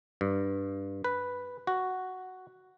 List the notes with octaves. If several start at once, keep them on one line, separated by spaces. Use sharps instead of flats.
G2
B4
F#4